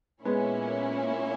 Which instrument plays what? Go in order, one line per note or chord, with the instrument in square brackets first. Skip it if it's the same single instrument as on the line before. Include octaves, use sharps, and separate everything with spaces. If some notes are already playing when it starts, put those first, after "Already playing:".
[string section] A#2 A#3 C#4 E4 [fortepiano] G#3 B3